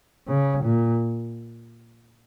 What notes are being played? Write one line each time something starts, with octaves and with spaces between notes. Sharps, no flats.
C#3
A#2